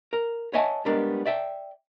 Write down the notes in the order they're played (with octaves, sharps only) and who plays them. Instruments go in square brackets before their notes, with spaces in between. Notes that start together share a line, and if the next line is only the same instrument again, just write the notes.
[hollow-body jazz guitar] A#4
C#5 D#5 E5 F#5 G#5 A5
G3 G#3 B3 D4 A#4
D5 E5 G5